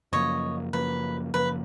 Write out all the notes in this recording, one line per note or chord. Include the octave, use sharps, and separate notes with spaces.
F#2 C#3 F3 A#3 C#5 D#5
F#2 C#3 F3 A#3 B4
F#2 C#3 F3 A#3 B4